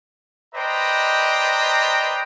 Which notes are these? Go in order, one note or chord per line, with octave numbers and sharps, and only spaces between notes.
B4 C5 D5 D#5 G5 A#5